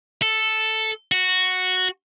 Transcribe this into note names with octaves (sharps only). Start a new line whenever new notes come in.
A4
F#4